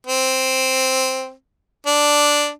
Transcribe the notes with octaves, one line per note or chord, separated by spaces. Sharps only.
C4
D4